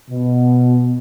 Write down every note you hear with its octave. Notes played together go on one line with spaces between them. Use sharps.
B2